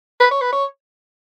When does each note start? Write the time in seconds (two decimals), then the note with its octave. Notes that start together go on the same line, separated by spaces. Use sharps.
0.20 B4
0.31 C#5
0.41 B4
0.52 C#5